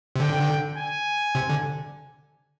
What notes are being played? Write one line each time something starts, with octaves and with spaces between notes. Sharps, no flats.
C3
D3 G5
G#5
C3
D3